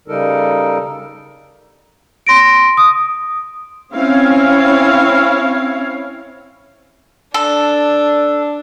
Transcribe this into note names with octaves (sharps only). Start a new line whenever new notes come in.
C#3 G3 D#4 A4 A#4
C6 A#6 D7
D#6
C4 C#4 E4 C#5 F5
D4 A4